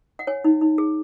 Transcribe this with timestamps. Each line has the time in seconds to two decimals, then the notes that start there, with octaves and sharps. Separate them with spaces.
0.19 F#5
0.27 C#5 G#5
0.44 D#4
0.61 D#4
0.78 G#4